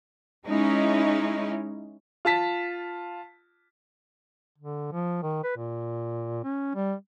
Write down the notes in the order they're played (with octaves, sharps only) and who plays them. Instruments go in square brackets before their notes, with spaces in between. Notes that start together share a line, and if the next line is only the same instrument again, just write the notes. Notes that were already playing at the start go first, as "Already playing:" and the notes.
[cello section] G#3 C#4 D#4 E4
[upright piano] F4 A5 B6
[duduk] D3
F3
D#3
B4
A#2
C#4
G3